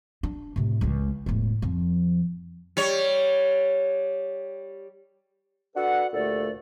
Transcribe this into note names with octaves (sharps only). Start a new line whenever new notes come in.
D4
A2 C3
C#2 G#3
E1 A2
F2 F3
G3 C#5
D4 F#4 A4 B4 F#5
D2 A#2 A3 G4 A4 D5